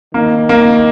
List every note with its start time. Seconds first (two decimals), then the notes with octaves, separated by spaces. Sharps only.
0.14 D#3 A#3
0.49 A#3